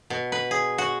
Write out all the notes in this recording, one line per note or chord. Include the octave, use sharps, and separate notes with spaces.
B2
B4
G#4
F#4